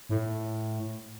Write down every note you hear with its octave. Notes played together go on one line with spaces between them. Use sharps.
A2